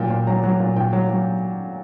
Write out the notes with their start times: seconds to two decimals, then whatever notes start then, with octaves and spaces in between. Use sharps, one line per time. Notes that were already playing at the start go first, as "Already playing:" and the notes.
Already playing: A#2 F#3 G5
0.10 A#2
0.27 F#3 A#5
0.43 F#3
0.60 A#2
0.76 A#2 G5
0.93 F#3
1.10 F#3